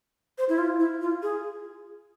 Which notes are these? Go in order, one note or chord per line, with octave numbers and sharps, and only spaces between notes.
C5
E4
F4
E4
F4
G#4